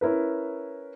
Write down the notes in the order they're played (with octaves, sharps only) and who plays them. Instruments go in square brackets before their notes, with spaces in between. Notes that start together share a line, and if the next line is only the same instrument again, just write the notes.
[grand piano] C#4 E4 A#4 B4